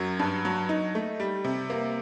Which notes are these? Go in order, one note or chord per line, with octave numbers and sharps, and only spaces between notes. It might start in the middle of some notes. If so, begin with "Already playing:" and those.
Already playing: F#2 F#3
G2
F#3
D#4
A3
G3
C3
A#3